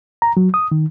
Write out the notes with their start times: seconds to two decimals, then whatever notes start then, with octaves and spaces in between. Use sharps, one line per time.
0.22 A#5
0.37 F#3
0.54 D#6
0.72 D#3